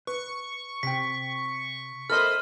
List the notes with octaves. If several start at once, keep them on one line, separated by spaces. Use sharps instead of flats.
B4 C#6
C3 G5 B6
A4 A#4 C5 D#5 E5 B5 C6 F6